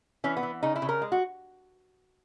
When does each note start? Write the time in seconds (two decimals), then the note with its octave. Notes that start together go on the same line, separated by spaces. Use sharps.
0.24 E3 C#4
0.37 B3
0.43 E3
0.63 C#3 D#4
0.76 E4
0.82 C#3
0.89 A#4
1.02 G#3
1.12 F#4